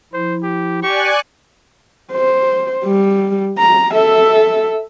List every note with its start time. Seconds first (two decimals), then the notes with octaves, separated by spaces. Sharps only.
0.13 F3 E4 C5
0.43 G4
0.82 G4 D5 G#5 C#6 F#6
2.12 C5
2.85 G3
3.59 A#5
3.94 A4 E5